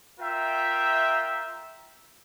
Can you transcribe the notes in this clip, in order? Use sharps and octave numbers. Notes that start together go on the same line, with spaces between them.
F4 A#4 E5 G5